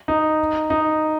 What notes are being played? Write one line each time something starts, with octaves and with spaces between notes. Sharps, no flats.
D#4
D#4